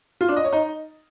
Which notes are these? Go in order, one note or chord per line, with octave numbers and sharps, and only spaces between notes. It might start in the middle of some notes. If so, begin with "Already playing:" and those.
F4
D4
D#5
C#5
D#4